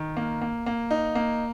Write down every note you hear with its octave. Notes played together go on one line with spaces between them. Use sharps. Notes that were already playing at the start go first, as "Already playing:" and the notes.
Already playing: D#3
A#3
A#3
A#3
D#4
A#3